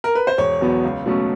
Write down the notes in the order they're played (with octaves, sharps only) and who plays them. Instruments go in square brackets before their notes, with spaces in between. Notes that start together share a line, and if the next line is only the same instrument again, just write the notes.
[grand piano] A#4
B4
C5
E1 C#5
E2 B2 F#3 B3
C#2
B2 F#3 A3 C#4